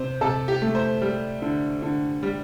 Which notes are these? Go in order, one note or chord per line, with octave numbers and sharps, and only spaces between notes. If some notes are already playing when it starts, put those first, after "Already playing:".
Already playing: C3 C5
C3 A4
G4
A3
C5
G3
D3
D3
G3